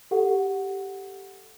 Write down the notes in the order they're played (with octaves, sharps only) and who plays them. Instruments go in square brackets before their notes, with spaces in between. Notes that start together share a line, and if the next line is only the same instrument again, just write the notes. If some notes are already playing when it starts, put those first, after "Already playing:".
[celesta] G4 A4 F#5